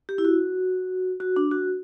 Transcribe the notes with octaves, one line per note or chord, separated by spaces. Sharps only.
G4
E4
F#4
F#4
D4
F#4